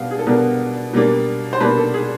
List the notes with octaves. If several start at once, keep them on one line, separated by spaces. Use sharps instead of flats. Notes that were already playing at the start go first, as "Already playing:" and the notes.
Already playing: B2 G3 B3 D4 F5
G#4
A4
B2 G3 B3 D4 A#4
B2 G3 A#3 D4
C5
B2 G3 A#3 D4 B4
A4
G#4